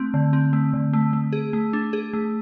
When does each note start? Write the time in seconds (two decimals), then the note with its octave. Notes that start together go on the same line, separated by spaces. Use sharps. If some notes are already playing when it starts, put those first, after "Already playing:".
Already playing: A3 C4
0.14 D3
0.33 C4
0.53 A3
0.73 D3
0.93 A3
1.13 A3
1.33 G#4
1.53 A3
1.73 D4
1.93 G#4
2.13 A3